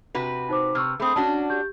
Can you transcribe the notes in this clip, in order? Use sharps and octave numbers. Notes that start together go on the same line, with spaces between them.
C3 F#4 B4
D#4 C5 D6
C3 C#6 E6 F6
A3 C4 G#4 B5 D#6
C#4 D4 F#4 A5
G4 G6